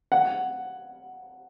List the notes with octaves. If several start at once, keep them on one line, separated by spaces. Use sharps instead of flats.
F#5